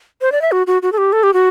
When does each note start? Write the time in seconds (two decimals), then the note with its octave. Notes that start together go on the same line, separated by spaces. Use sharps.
0.21 C5
0.32 D5
0.42 E5
0.52 F#4
0.67 F#4
0.82 F#4
0.92 A4
0.98 G4
1.13 A4
1.23 G4
1.33 F#4